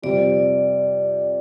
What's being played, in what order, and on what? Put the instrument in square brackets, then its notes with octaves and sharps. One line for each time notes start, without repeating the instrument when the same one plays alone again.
[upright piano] F2 C3 G3 C4 [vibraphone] D5